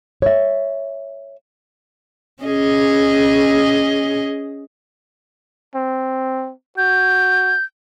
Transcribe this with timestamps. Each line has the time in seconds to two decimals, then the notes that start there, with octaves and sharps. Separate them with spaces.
0.22 C#5 E5
2.43 C#4 G#4 D#5
5.75 C4
6.78 F#4 G6